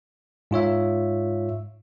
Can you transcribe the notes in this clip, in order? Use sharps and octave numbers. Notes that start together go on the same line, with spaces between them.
G#2 F4 C#5 E5